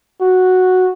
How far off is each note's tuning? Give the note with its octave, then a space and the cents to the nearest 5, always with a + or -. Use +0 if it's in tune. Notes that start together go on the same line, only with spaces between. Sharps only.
F#4 -5